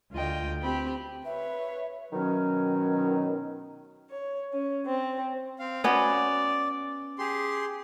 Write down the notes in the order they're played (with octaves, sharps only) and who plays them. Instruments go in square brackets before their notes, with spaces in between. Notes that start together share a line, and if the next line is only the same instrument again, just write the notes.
[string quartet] D2 F4 D#5 G5
C4 G4 B5
[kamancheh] B4 C#5 [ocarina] E5
[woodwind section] B2 D#3 F#3 C#4
[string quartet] C#5
C#4
C4
[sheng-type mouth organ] C4 F5
[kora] B3 C#4 F#4 [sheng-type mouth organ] D5
[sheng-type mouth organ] G4 G#4 C6